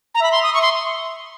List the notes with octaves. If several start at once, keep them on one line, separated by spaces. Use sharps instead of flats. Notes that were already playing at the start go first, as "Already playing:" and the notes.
A#5
E5 B5
C6
D#6
C#6
C6